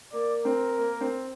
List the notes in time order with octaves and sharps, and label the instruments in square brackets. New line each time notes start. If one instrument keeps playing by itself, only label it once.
[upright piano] A#3 [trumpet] D5
[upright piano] C4 [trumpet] A#4
[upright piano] A#3
C4